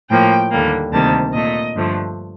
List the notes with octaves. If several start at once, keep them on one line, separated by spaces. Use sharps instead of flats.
A2 F3 A#3 G5
D#2 D3 G3 A#3
D2 C3 D#3 G3 A#3 A5
A#2 A3 D#5
G2 D3 F3 A3